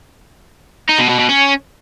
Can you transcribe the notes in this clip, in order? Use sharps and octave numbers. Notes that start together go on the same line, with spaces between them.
D#4
B2
B2
B2
C#4